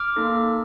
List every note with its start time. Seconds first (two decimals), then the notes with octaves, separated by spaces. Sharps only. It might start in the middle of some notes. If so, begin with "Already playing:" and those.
Already playing: D6 F6
0.16 A#3 D#4 A4